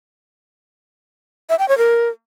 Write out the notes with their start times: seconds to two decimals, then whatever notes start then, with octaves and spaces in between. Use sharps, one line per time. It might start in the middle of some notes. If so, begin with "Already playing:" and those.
1.49 E5
1.59 G5
1.68 C#5
1.78 A#4